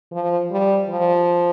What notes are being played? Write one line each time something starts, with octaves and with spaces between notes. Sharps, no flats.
F3
G3
F3